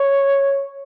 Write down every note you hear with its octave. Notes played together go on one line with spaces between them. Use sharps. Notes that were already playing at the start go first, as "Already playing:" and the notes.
Already playing: C#5